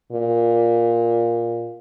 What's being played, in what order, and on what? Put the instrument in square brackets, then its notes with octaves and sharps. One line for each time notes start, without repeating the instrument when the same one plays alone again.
[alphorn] A#2